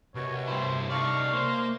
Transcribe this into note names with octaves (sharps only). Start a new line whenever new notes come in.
C2 F#2 B2 C#5
G2 E4 C5
A3 D#4 D5 F5 C#6
A#3 C5